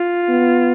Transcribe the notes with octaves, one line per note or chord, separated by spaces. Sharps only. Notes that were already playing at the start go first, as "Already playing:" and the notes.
Already playing: F4
B3